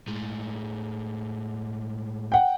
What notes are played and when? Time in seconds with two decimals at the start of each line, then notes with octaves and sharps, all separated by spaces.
0.08 A2 G#3
2.32 F#5 G5